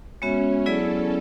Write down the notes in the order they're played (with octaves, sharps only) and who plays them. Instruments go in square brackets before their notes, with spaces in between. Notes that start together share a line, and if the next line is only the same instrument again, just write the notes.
[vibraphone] G#3 B3 F#4 C#5 E5 [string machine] C#4
[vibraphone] F#3 B3 E4 G#4 D5 [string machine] A4